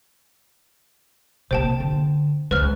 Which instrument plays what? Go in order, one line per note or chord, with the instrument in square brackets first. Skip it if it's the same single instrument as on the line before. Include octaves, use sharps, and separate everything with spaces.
[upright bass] C3 A#3 [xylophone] C5 G5 A5
[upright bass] D3
[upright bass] C#2 [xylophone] B4 C5 F6